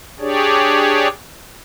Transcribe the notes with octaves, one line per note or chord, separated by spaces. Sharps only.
D4 G4 G#4 C#5 D5